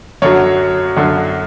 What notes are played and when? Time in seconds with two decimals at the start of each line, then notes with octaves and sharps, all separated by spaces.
0.22 F#2 D3 F#3 C#5
0.97 F#2 D3 F#3